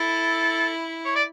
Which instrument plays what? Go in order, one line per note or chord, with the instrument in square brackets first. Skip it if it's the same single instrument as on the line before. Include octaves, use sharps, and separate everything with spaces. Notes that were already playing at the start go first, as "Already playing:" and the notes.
Already playing: [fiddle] E4 [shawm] A4
[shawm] C#5
D5